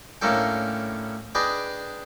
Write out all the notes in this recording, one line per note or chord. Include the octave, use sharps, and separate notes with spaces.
A2 A#3 C#4 D4 A4 G5
D4 G#4 B4 D5 D#5 G5